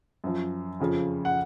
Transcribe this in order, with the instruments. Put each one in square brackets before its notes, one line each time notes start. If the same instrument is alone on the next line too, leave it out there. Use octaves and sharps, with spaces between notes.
[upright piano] F#2 F3
F2 C#3 F3
F#5